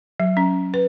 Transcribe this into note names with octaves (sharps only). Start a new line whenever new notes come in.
F#3
C#4
B4